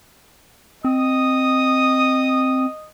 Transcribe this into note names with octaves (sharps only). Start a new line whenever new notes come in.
C4 D#5 D#6